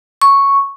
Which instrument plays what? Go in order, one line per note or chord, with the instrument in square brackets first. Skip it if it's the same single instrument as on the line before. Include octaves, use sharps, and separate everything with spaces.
[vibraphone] C#6